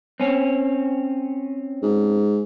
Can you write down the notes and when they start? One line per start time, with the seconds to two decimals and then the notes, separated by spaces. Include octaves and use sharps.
0.20 C4 C#4
1.83 G#2